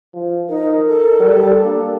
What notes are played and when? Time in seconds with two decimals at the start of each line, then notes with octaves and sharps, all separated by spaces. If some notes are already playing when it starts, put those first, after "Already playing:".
0.13 F3
0.49 D#4 A#4
0.87 A4
1.20 G3
1.64 A#3 D4